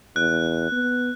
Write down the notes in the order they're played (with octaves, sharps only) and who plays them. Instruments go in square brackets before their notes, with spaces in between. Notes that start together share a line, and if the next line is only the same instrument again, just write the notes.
[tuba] E2 [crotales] F#6
[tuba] B3